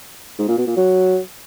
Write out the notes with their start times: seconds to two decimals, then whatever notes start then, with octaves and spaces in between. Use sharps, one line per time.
0.39 G#2
0.48 A#2
0.58 B2
0.67 A#2
0.77 F#3